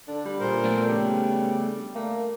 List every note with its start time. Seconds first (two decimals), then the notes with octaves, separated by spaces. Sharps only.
0.08 D3 D4
0.25 G3
0.40 A#2 A#4 C5
0.64 F3 A3 B3 D4
0.89 C#3 G3 G4
1.95 A3 A#3